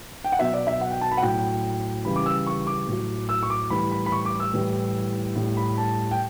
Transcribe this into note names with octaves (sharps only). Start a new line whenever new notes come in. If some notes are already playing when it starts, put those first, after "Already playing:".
G5
F#5
B2 F#3 E5
D5
E5
F#5
G5
A5
B5
F#5
A2 F#3 G5
C#3 E3 G3 B5
D6
E6
C#6
D6
A2 F#3
E6
C#6
D6
A2 E3 G3 B5
B5
B5
C#6
D6
E6
A2 E3 G3
A2 G3
B5
A5
G5